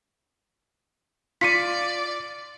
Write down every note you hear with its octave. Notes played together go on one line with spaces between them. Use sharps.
F4 D5 B6 C#7 D#7